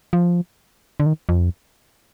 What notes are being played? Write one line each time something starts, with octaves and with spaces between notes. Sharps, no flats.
F3
D3
D#3
F2